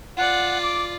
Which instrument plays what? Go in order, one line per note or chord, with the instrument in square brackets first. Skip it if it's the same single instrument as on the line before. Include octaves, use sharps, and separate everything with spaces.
[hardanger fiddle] F4 D5 [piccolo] F#5
[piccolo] D6